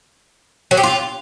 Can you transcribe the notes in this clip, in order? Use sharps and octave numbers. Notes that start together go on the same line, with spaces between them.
F#3
G4
F4